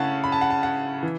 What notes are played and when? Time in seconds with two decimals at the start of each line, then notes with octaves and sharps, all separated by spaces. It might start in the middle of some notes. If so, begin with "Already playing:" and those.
Already playing: C#3 A3 C#4 E4 F#5 A5
0.24 B5
0.32 A5
0.41 F#5
0.50 A5
0.63 F#5
1.03 E3